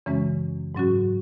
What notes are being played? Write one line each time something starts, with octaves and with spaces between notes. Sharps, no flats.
F#2 C#3 E3 G#3 C#4
G#2 F#3 C#4 F#4